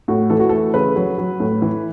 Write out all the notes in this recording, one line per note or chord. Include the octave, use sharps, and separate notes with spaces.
A2 F#4
E3 A4
F#4
A3 A4
C#3 B4
F#3
F#3
A2
E3